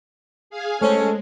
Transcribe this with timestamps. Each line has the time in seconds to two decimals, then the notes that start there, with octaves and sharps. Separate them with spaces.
0.50 G#4 F5 G#5
0.81 G#3 A3 C#4 A4 C5 C#5